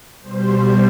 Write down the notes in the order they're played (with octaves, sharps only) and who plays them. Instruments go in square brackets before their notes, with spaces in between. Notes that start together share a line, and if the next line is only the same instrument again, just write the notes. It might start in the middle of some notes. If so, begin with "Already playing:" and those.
[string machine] B2 G3 C5